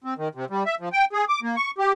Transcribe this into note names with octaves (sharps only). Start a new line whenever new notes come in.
C4
D#3
C3
G3
E5
F3
G5
G#4
D6
A#3
C#6
G4